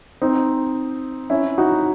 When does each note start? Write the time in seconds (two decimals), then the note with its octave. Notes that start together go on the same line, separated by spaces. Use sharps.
0.22 C4 D#4
1.30 C#4 E4
1.58 D#4 F#4